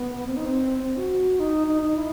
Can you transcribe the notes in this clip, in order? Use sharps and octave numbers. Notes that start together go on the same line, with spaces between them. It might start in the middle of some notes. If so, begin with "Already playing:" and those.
Already playing: B3
C4
D#4
C4
C4
F#4
D#4
D#4
D#4
E4